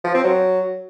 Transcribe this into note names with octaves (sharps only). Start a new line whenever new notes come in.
F3
C4
F#3